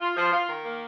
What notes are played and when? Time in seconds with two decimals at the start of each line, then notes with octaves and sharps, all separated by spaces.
0.01 F4
0.16 F3
0.32 F4
0.48 D#3
0.64 A#3